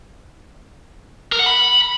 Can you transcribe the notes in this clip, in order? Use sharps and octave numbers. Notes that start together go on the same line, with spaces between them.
A#4
F#5
B5